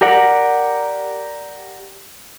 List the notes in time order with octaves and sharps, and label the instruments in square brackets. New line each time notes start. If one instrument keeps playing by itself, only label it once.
[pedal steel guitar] G4 A#4 D5 F#5